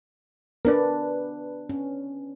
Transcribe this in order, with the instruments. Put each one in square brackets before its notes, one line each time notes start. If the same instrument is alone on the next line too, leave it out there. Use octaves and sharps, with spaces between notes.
[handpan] B3 D4 B4 [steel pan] A#4 D5
[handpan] C#4